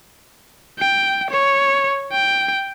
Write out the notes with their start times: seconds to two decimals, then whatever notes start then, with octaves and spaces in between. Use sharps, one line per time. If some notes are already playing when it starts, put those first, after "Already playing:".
0.79 G5
1.30 C#5
2.11 G5